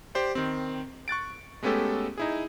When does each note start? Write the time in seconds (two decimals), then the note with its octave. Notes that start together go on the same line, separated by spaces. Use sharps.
0.15 G4 C5 D5
0.35 D#3 C4
1.08 C#6 F#6 A6 D7
1.63 G#3 A3 B3 C#4 G4 A4
2.18 D#4 E4 G#4